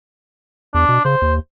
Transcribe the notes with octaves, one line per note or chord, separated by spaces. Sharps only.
E2 D4
B2
C#3 C5
D#2